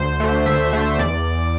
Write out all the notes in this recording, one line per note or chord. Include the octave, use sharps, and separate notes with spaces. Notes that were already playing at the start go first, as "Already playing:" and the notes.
Already playing: D2 C5
D3 A3
D2 E5
D3 A3
E2 D5